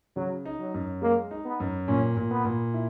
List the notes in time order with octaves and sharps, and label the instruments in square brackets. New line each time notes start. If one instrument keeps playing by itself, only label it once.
[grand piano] C#3 [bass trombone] F#3
[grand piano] D#4
[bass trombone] F#3
[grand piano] F#2
[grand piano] G#3 [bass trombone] A#3
[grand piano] D#4
[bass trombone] B3
[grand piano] F#2
[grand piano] A#2 [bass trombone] C#4
[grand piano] A#2
[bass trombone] B3
[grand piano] A#2
E4